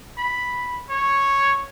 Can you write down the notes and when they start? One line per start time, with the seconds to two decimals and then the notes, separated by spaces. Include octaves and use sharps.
0.18 B5
0.90 C#5